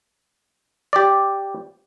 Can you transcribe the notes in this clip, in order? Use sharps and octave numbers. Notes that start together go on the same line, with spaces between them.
G4 D5